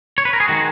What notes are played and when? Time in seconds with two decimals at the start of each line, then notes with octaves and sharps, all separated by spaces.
0.18 C#5
0.25 B4
0.33 A#4
0.40 G#4
0.48 D#3 G#3 F#4